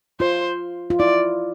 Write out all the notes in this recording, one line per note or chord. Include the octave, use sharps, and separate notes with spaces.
F4 C5
F4
E4 D5